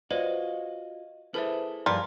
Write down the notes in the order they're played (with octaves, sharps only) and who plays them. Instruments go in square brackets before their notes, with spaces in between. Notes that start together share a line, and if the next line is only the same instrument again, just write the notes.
[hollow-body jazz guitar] F4 F#4 [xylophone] B4 C5 D5 [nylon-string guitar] D#5
[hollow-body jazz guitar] E4 G#4 A4 [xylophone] B4 C5 E5
[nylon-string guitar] G2 F3 B4 [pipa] G3 F4 A#4 [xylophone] D5